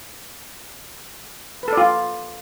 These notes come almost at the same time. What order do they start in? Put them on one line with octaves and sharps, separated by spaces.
B4 A4 D5 F4